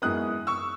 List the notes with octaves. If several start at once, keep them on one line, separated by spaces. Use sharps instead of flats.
F#2 E3 G#3 B3 D#6 F#6
C#6 E6